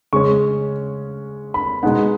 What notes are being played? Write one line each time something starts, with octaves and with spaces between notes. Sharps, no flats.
C#3 G#3 C#4 C#6
B5
B2 G#3 B3 D#4 F#5